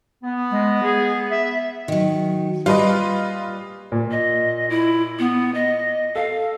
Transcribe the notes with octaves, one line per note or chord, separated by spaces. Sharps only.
B3
G#3
G#4
E5
D#3 F#3
A#2 G3 F4 B4 D#5
A#2
D#5
E4
B3
D#5
A4 F5